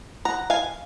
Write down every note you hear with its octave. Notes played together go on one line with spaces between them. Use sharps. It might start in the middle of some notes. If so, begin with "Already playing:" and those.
F#5 A#5
F5 G#5